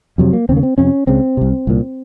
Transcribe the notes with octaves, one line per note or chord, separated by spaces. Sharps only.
F2 C3 F#3
A#3
D#2 C#3 A#3 C4
C4
F2 C3 C#4
C#2 C#3 C4
C2 C3
C2 A#2